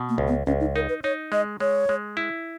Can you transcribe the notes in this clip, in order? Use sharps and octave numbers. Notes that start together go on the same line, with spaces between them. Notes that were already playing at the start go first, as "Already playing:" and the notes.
Already playing: B2
A#3
C#2
B3
C#2 C#4
D#4
D#4 A#4
B4
D#4 C#5
G#3 D#5
G#3 C#5
G#3
E4